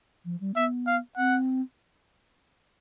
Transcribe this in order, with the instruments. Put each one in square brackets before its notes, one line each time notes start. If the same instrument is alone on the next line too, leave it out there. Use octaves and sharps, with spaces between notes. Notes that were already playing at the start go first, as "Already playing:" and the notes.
[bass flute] F3
G3
[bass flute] B3 [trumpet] E5
[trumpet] F5
[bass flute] C4 [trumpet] F#5